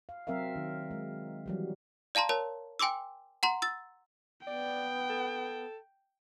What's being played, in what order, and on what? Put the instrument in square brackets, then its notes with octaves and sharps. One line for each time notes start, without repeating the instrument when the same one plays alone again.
[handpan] F5
F#3 C4 A#4 E5 F5
D#3
G#3
E3 F#3 G3
[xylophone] D5 F5 A5 A#5 C6
A#4 C#5 A5
G5 G#5 C6 D6 E6
F#5 A#5 C6
E6 A6
[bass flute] B3 [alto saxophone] D5 [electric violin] G5
[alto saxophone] A4